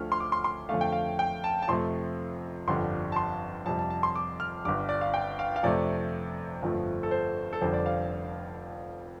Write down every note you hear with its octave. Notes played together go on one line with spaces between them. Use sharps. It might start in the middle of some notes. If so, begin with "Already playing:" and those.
Already playing: D2 D3 F3 A3 F6
C6
D6
C6
C6
F2 D3 A3 F5
G5
F5
G5
A5
A5
F2 C3 F3 A3 C6
G1 F2 D3 G3 C6
A5
C6
F2 C3 G3 A5
A5
A5
C6
D6
F6
G1 G2 G3 D6
D5
F5
G5
F5
F5
F2 C3 A3 D5
G1 F2 F3 A3
A4
C5
A4
F1 F2 D3 G3 C5
D5
F5